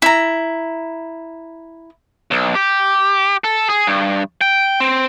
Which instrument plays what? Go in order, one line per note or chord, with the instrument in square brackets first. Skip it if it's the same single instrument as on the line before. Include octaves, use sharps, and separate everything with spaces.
[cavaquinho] E4 A#5
[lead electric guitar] B1
G4
A4
G#4
G2
G5
C4